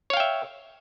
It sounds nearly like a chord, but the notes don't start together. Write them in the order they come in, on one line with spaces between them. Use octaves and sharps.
C#5 F5 G5 E5